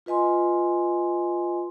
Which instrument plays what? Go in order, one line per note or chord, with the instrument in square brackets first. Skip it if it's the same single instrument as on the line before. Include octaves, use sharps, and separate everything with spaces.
[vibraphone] F4 B4 D#5 G#5 C6